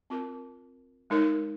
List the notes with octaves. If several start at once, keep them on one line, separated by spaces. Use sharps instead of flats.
C4 F4 A#4
G#3 D#4 A#4 C#5